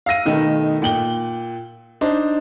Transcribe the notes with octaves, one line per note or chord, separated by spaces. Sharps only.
F5 E6 A#6 D#7
B2 D#3 A3
A#2 G5 F#7 G7
D4 D#4 C5